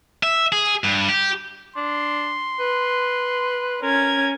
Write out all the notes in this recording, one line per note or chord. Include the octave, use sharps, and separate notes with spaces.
E5
G#4
G2
G4
D4 C6
B4
C#4 A#4 G#6